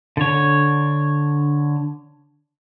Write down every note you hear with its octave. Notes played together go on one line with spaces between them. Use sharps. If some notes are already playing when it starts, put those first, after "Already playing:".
D3 C#5